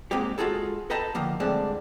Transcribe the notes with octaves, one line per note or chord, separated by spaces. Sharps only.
G#2 G#3 A#3 C4 G4
G#3 F4 F#4 G#4 A4
A4 B4 D#5 G5 A5 A#5
D3 D#3 F3 A#3
A2 D3 G3 G#3 C4 D4